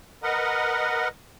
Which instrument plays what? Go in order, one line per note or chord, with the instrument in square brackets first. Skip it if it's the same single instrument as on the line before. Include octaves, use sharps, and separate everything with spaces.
[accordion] A#4 B4 D#5 F#5